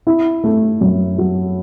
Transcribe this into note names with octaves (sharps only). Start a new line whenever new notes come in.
E4
A3
F#2
F#3